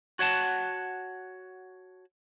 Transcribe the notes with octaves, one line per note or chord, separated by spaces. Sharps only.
F#4 C#5 F#5 A5